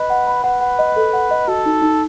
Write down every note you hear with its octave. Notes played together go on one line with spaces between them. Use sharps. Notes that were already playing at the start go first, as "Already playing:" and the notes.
Already playing: B4 D#5
F#5
B5
B4 F#5
F#5
D#5
A4
F#5
D#5
F#4 A4
D#4
D#4